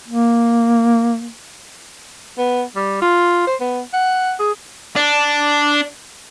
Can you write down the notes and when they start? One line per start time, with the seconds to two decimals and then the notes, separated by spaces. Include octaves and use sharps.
0.08 A#3
2.38 B3
2.76 G3
3.02 F4
3.47 C5
3.61 B3
3.93 F#5
4.40 G#4
4.96 D4